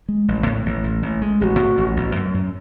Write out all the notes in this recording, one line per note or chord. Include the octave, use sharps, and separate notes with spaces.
G#3
A1
A2
A1
A1
A1
G#3
A1 F#4 G#4
A2
A1
A1
F#2
F#2